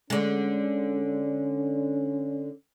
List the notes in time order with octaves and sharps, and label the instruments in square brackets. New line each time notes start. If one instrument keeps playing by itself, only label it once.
[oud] D3 G#3 [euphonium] C#4